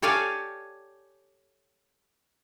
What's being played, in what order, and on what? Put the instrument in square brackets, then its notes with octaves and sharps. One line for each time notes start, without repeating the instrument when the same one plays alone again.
[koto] G4 A4 C#5 D5 F5 G#5